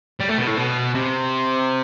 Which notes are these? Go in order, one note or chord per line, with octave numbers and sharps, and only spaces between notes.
G3
A3
B2
A2
B2
C3